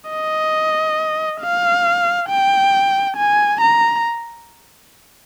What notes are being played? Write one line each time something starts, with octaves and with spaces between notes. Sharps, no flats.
D#5
F5
G5
G#5
A#5